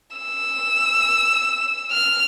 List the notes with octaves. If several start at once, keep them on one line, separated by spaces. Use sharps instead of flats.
E6
F6